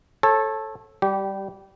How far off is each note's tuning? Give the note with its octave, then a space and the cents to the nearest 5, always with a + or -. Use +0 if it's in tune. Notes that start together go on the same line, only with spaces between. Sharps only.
A4 -5 C#5 -30
G3 +0 G4 -20